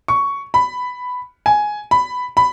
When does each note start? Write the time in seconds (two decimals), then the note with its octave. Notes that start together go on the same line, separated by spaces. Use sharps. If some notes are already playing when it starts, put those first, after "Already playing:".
0.08 C#6
0.54 B5
1.46 G#5
1.91 B5
2.37 B5